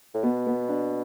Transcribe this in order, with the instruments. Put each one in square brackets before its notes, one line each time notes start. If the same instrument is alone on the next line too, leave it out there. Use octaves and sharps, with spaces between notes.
[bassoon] A2
[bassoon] B2 [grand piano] B3
[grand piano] B3
D4